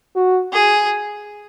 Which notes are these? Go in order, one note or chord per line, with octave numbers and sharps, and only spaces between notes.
F#4
G#4